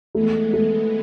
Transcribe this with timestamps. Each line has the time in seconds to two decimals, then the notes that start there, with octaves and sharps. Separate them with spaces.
0.15 E3 G#3 A3 B3
0.53 A3